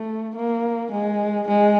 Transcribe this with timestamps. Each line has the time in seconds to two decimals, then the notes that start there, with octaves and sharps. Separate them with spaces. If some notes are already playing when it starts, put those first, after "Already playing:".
Already playing: A3
0.36 A#3
0.92 G#3
1.48 G#3